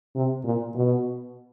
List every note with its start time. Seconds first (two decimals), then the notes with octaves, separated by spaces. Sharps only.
0.15 C3
0.45 A#2
0.75 B2